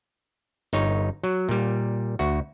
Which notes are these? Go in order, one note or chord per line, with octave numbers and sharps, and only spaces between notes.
G1 D#4 C#5
F#3
A#2 G3
D2 F#4